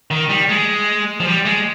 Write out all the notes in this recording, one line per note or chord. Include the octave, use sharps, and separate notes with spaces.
D#3
G3
G#3
F3
G3
G#3